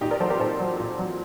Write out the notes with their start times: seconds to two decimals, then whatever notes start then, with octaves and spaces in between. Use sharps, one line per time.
0.01 A#2 D#4 G4
0.11 A#4 D5
0.20 F#3 A4 C5
0.30 G4 A#4
0.40 A#2 A4 C5
0.60 F#3
0.80 A#2
0.99 F#3